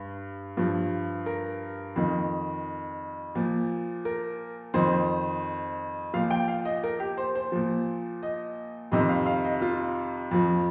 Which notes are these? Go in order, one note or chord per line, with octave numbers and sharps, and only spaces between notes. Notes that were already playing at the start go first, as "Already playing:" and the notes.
Already playing: G2
G2 F3
A#4
F2 D#3
A#2 F3
A#4
F2 D#3 C5
A#2 F3 F5
G5
F5
D#5
A#4
G4
C5
C5
A#2 F3
D#5
F2 C3 D#3 D#5
F5
F5
D#5
F4
F2 F3